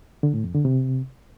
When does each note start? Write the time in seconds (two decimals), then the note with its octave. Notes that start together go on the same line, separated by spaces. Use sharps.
0.23 D3
0.34 A2
0.44 F2
0.54 D3
0.65 C3